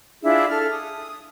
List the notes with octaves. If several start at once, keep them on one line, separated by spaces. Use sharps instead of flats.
D4 E4 F4 G#4
A4 F6
D#6